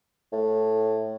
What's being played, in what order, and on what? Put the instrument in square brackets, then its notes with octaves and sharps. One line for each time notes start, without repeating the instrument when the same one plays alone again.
[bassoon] A2